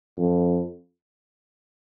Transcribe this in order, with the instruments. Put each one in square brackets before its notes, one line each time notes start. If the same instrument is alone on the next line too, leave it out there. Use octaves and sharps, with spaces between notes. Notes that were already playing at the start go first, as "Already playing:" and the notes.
[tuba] F2